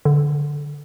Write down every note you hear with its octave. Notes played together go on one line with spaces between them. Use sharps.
D3